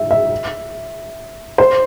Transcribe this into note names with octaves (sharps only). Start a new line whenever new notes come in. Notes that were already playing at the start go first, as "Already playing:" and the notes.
Already playing: E5
E5
C5